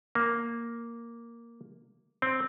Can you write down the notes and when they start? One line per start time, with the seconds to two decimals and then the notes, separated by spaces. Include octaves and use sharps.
0.15 A#3
2.22 C4